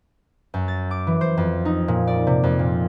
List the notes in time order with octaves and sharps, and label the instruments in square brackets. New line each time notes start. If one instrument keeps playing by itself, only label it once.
[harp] F#2
A6
D6
E3
C5
F2
D#4
A#2
D5
C3
F2
A#2